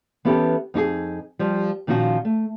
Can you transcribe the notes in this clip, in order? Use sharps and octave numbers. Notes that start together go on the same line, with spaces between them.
E3 B3 C#4 G4 A4
F2 D#4 F#4 G#4
F3 G3 G4
A#2 D#3 F3 C#4 F#4
A3